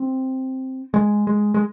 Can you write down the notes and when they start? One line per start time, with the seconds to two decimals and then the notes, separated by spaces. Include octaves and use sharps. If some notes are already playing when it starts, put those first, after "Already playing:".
Already playing: C4
0.94 G#3
1.27 G#3
1.54 G#3